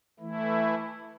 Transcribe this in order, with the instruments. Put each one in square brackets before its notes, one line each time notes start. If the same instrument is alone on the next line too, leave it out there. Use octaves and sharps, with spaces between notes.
[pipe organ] E3 A3 E4